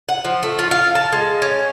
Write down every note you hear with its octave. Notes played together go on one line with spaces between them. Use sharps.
F#5
F3
A3
F4
F5
A5
G#3
C#4